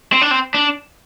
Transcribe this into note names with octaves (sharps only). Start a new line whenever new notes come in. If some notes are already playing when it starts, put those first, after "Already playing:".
C4
D4
C4
D4